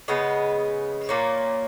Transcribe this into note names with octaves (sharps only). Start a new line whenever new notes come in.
C#3 G#3 B3
A#2 A#3 C#4